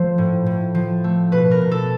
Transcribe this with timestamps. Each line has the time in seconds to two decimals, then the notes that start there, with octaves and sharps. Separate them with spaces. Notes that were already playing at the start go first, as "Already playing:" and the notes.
Already playing: F3 A3 C5
0.18 A2
0.46 A2
0.75 F3
1.04 A3
1.32 B2 B4
1.51 A#4
1.61 B2
1.71 A4